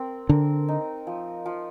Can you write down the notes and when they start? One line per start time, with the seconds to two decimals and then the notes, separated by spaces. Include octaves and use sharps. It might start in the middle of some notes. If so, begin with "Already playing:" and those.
Already playing: C4 A#4
0.29 D3 A#4
0.68 D#4
1.07 F3
1.46 F3